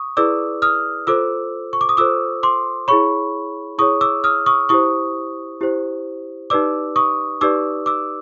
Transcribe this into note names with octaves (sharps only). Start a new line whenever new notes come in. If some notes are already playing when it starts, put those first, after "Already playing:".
Already playing: C#6 D#6
E4 G#4 B4 D5 D6 E6
D#6 F6
F4 A4 C5 D6 E6
C#6
D6
D#6
F4 A4 C5 D6 E6
C6 D6
E4 G#4 C#5 B5 C#6
E4 G#4 C#5 C#6 D#6
D6 E6
D#6 F6
C#6 D#6
E4 G4 C5 C#6 D#6
E4 G4 C5
D#4 G4 B4 D5 D6 E6
C#6 D#6
D#4 G4 B4 D5 D6 E6
D6 E6